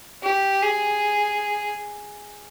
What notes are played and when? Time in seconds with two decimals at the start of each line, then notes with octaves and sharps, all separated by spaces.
0.23 G4
0.62 G#4